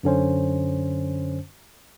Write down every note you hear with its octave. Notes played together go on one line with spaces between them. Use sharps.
F#2 D3 C#4 C5